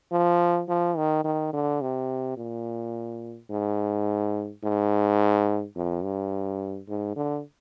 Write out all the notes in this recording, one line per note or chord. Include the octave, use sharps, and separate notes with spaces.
F3
F3
D#3
D#3
D3
C3
A#2
G#2
G#2
F2
G2
G#2
D3